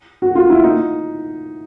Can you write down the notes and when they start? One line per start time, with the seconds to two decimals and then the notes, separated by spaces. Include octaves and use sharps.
0.22 F#4
0.35 F4
0.50 E4
0.64 D#4